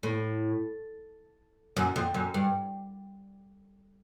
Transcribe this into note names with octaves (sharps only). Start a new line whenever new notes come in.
A2
F#2
F2
F#2
G2